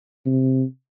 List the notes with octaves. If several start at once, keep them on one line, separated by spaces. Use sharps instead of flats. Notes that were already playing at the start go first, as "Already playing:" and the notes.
C3